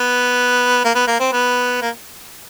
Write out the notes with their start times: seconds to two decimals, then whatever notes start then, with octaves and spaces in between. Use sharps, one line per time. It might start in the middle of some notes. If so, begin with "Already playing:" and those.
Already playing: B3
0.85 A#3
0.95 B3
1.07 A#3
1.20 C4
1.32 B3
1.82 A#3